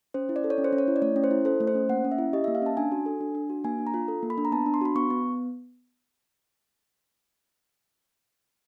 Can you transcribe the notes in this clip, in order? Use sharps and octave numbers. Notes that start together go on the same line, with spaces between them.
C#4 C5
E4
D5
A4
C#5
C#4
C5
C#4
C#5
E4
D5
A3 C#5
C#4
C5
E4
A4 C5
A3
C5
C#4
A#3 F#5
C#4
E5
E4
G4 D#5
A#3 E5
F5
C#4 A5
D4 G#5
F#4
A4
D4
D4
F#4
A#3 G#5
D4
A#5
F4
A4
A#3
B5
D4
A#5
B3 A5
D4
C6
F#4 B5
B3 C#6
B3